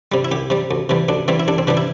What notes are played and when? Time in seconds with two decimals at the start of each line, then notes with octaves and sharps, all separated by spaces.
0.12 C3 G3
0.25 E4
0.31 C2 G4
0.50 C3 G3
0.71 D2
0.89 C3 E3 G3
1.09 D2 D4
1.28 C3 E3 G3 C4
1.40 E4
1.48 C2 D4
1.58 C4
1.67 C3 E3 G3 D4
1.77 E4